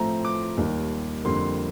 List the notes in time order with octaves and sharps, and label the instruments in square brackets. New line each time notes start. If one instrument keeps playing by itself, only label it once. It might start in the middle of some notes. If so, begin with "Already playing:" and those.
Already playing: [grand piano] A2 F3 A3 C4 A#5
D6
D#2 D#3 G3
F2 D3 G3 A#3 C6